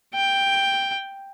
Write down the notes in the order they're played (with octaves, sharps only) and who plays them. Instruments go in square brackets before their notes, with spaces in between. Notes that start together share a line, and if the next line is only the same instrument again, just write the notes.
[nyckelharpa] G5